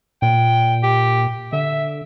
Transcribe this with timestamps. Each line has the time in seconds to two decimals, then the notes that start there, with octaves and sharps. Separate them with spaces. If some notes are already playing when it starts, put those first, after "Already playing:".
0.22 A#2 G5
0.83 G4
1.53 D3 E5